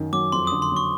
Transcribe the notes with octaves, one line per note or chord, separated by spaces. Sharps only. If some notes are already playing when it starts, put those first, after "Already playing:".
Already playing: F#2 D#3
F#3 D6
F2 C6
D3 D#6
C6
F#3 C#6